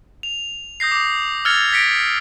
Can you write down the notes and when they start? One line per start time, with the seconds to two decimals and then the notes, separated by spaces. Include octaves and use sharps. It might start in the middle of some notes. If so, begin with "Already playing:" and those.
0.23 F7
0.80 D#6 G6 A#6 C7
0.92 D6 D#6
1.45 E6 F6 G#6 A6 C#7 F7
1.73 A#6 B6 C#7 D7